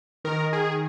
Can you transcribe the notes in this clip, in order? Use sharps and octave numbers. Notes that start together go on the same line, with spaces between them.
D#3 A#4
G#4